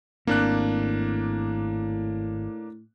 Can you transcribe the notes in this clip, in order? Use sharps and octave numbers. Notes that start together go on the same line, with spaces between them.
G#1 A2 A#3 C4 D4 F#6